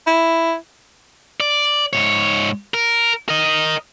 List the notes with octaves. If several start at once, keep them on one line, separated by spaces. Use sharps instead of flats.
E4
D5
G#2 C#5
A#4
A#4 D#5